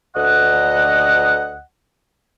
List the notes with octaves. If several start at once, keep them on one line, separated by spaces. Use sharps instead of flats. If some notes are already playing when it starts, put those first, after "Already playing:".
D2 D#5 F#5